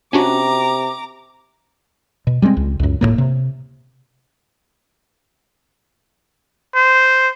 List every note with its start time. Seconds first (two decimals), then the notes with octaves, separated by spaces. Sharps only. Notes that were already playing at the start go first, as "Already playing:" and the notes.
0.13 C3 C#4 D4 F#4 A#5 D6
2.27 B2
2.42 G3 G#3 A#3 C4
2.57 C#2
2.80 C#2 F#2
3.01 D1 E2 A2 A#3
3.18 C3
6.75 C5